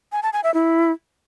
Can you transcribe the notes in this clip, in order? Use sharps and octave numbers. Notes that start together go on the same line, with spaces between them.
G#5
A5
G#5
E5
E4